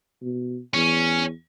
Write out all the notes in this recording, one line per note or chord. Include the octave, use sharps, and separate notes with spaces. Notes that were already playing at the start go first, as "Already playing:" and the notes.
B2
E2 C#4